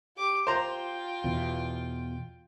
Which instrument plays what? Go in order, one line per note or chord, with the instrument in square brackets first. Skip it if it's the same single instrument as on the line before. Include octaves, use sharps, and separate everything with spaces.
[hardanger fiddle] G4 D6
[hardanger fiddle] F4 G5 [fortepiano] C5 A#5
[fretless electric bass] E2 B2